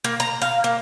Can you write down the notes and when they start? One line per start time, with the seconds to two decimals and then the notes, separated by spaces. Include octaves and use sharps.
0.04 A#3
0.20 A#5
0.42 F5
0.64 A#3